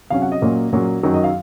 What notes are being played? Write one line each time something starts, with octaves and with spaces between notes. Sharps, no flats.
C3 F#3 C#4 F5
F#5
D#5
A#2 F#3 A#3 C#4
A#2 F#3 A#3 C#4
F#2 D#3 F#3
D#5
F5